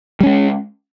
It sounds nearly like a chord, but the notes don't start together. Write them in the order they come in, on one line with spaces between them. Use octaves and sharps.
G3 C#4 G#3